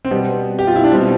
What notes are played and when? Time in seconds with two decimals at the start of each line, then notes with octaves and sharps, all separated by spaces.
0.05 C4
0.11 B2 G3 B3
0.59 G4
0.67 F4
0.76 E4
0.84 D4
0.92 B2 G3 C4